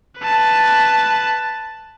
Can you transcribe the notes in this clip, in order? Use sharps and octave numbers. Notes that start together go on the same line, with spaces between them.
B4 A5